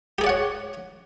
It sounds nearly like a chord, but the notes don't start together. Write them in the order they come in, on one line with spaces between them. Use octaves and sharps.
G4 G#4 D5 F#5 C#5